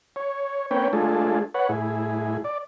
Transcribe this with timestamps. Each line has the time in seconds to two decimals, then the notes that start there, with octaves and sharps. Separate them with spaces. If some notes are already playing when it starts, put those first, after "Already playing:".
0.16 C#5
0.71 A#3 C4 C#4 B4 C#5 G5
0.93 G#3 A3 D4 F4 G#4 A4
1.54 B4 C#5 F#5
1.69 A2 E4 G#4
2.44 D5